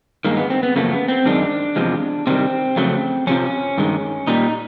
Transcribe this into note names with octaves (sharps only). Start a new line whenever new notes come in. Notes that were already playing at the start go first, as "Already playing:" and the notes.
G2 D#3 G#3 A#3
B3
C4
B3
F#2 C#3 F3 A3 A#3
B3
C4
F#2 D#3 G#3 D4
E2 C3 F3 G#3
C3 D#3 G3 C4
F2 C#3 F#3 A3
F2 C3 F3 C#4
G2 D#3 G#3
A#2 G3 D#4